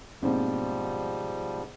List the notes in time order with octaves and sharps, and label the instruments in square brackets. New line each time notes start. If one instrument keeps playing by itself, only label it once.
[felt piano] G#2 B2 [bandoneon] F3 G3 [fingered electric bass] A#3 C4 C#4